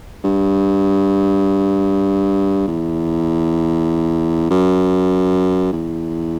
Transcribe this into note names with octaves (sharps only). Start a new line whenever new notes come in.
G2
E2
F#2
E2